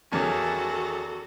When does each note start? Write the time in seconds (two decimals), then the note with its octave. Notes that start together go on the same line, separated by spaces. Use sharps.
0.12 E2 D#3 C#4 F#4 A4